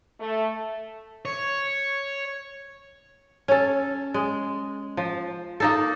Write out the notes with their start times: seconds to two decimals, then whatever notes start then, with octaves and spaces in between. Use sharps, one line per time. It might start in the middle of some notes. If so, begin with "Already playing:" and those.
0.20 A3
1.25 C#5
3.48 C#4 A4
4.14 G#3
4.97 F3
5.60 A#3 D#4 A4